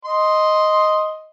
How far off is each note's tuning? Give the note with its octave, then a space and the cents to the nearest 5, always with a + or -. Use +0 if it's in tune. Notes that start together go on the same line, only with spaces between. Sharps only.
D#5 +0 C6 +0